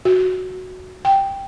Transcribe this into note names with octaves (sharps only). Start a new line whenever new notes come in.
F#4
G5